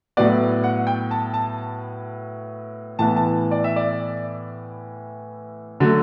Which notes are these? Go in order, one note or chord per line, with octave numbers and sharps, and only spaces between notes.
A2 F#3 B3 D5
F#5
G5
A5
A5
A2 E3 B3 A5
A5
D5
E5
D5
D3 F#3 A3